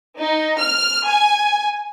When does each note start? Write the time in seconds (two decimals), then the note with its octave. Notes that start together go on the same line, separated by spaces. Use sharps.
0.19 D#4
0.60 F6
1.07 G#5